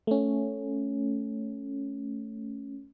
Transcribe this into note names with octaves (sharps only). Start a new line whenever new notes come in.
A3 C#4